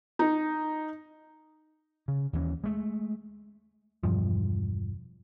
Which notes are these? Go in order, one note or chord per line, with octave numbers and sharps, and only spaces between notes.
D#4
C#3
D#2 E3 C#4
G#3 A3
E1 C2 G2 F3